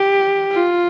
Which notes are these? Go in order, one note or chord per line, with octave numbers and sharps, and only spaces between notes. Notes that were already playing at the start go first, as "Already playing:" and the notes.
Already playing: G4
F4